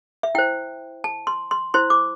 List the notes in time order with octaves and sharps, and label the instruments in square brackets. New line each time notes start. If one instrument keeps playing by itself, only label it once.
[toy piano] E5
E4 C5 G5
A5
C6
C6
E4 C5 C6
D6